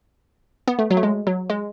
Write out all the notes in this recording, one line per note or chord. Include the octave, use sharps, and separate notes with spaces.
B3
A3
F#3
A3
G#3
F#3
G#3